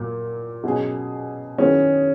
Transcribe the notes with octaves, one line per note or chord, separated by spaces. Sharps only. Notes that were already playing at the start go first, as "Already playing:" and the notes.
Already playing: A#2 F#3 A#3
B2 F#3 C#4 G#4
D#3 F#3 B3 C#4 E4 G#4